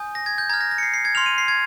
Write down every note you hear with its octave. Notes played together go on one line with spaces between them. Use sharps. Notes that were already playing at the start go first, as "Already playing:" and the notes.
Already playing: G#5 D#6 G6
A#6
G#6
G6
A#5 F6 G#6
A#6
A#6
C#7
C7
C7
G#6
C6 F6 F7
D#7
C7
G#6